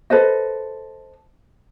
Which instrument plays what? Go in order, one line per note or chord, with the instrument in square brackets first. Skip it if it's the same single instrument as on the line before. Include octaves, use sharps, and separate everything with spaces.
[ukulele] A4 B4 C5 D#5